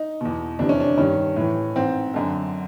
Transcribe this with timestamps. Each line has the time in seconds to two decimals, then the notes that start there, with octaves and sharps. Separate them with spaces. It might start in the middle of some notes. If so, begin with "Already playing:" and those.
Already playing: D#4
0.21 E2 B2
0.59 F2 C3 E3 D4
0.69 C#4
0.80 D4
0.98 G2 D#3 C#4
1.36 A2 E3
1.76 G#2 E3 C4
2.14 F#2 D3